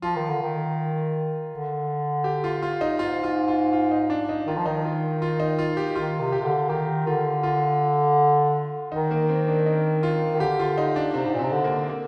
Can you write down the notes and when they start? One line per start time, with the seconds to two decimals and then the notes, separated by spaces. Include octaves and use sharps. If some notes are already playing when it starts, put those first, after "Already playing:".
0.02 F3 F4
0.16 D#3
0.29 D3
0.42 D#3
1.50 D3
2.24 G4
2.44 F4
2.62 F4
2.81 D#4
2.99 G#2 F4
3.24 F4
3.48 F4
3.73 F4
3.91 D#4
4.10 D4
4.29 D#4
4.47 D#3 F4
4.57 F3
4.66 D#3 D#4
4.85 F4
5.22 F4
5.40 D#4
5.59 F4
5.77 G4
5.96 D#3 F4
6.20 C3
6.32 G4
6.40 C3
6.45 D3
6.69 D#3 G4
7.07 D3 F4
7.43 F4
8.92 D#3 D#4
9.11 A#3
9.29 C4
9.48 D4
9.66 D#4
10.03 F4
10.34 D#3
10.40 D3 G4
10.59 F4
10.78 D#4
10.96 D4
11.14 C3 C4
11.26 G#2
11.34 A#2
11.39 C3 C4
11.52 D3
11.64 A#3
11.89 A#3